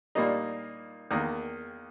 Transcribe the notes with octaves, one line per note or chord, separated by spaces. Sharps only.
A#2 G3 A#3 D#4
E2 D#3 A#3